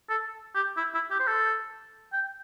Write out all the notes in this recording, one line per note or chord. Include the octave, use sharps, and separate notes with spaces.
A4
G4
E4
E4
G4
C5
A4
G5